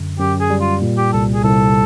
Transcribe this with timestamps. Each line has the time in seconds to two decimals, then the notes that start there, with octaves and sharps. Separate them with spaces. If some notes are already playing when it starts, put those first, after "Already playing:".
Already playing: F#2 D3
0.19 F#2 G4
0.41 G#4
0.50 G3
0.61 F4
0.81 A#2
0.98 G4
1.13 C2 A4
1.34 G#4
1.44 C2 A4